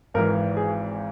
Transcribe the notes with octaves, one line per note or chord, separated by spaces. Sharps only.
G#1 G#2 E3 A#4
G#4